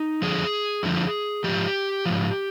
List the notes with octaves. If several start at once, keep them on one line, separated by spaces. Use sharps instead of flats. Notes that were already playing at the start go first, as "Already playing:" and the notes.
Already playing: D#4
F2 D3 F3 G#4
F2 D3 F3
G#2 F3 G4
G#2 F3